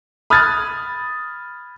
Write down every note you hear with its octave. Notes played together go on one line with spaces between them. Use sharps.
B5 D#6 F6 F#6 G#6 A6